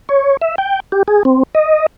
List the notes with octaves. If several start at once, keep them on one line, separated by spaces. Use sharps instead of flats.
C#5
E5
G5
G4
G#4
C4
D#5